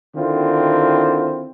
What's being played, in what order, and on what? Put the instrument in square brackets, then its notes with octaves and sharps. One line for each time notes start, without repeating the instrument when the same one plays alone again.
[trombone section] D3 D#3 C4 E4 F4